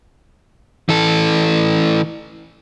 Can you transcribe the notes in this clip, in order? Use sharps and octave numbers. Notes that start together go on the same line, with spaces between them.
E3 A4